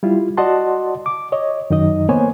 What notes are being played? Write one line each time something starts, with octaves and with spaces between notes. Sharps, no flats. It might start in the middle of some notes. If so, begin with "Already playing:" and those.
G3 E4 F4
F#4 D5 D#5 F#5 A5 C6
D6
C#5 D#5
F#2 D#3 D#4 D#5
A#3 B3 C5 C#5 G#5